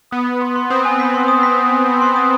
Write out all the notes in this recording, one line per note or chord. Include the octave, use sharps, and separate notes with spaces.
B3 D#6
B6
C6
C6
C4 D#6
G#5
B6
C6
D#6
B6
D#6
G#5
C6
C6
D#6